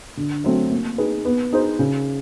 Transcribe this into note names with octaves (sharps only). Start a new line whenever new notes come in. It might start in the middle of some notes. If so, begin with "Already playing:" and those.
D3
F#3 A3 C4
A#3
D#4 G#4 B4
B3
D#4 G#4 C5
C#3